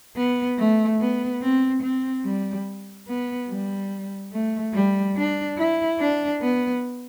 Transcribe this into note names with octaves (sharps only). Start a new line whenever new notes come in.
B3
A3
B3
C4
C4
G3
B3
G3
A3
G3
D4
E4
D4
B3